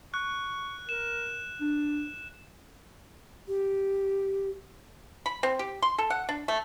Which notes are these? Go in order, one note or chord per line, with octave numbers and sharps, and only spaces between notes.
C#6 F#6
A#4 E7
D4
G4
B5
C4
G4
C6
A4
F#5
D4
A3